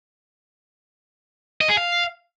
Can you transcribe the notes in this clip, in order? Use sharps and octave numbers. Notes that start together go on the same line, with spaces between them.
D#5
G#4
F5